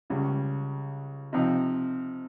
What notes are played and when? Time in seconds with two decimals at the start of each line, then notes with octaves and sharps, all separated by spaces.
0.10 C#2 C#3 G3 C#4
1.33 C3 F3 C4 D#4